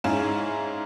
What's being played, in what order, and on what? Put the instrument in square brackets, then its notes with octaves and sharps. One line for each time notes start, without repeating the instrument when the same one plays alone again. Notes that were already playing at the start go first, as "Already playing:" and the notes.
[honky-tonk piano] G#2 C#4 E4 G#4 F5 E7